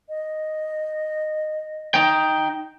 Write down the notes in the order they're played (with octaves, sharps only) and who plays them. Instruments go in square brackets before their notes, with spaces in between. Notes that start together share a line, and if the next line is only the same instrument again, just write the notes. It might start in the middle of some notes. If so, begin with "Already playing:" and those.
[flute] D#5
[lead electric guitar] D#4 G5